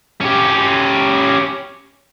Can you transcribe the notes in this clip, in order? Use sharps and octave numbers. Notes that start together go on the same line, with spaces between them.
C#4 G4